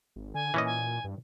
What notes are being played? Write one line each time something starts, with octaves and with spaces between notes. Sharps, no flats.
G#1
D3 G#5
A#2 E3 C#4 D#5
G#5
G2